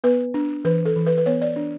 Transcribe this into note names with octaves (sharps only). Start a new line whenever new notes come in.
B3 B4
D4
E3 B4
A4
E3
B4
B4
B3 C#5
D5
D4